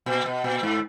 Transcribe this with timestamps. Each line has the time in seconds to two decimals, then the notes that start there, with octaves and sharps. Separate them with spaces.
0.06 A#2
0.26 B2
0.44 A#2
0.63 G#2